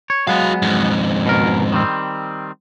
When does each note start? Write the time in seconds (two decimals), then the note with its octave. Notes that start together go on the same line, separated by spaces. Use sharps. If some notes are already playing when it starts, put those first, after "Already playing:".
0.10 C#5
0.27 F#3 G#3 B3 F#4 F5
0.62 F2 G#2
1.26 B2 A#4
1.72 D#3 G3 C4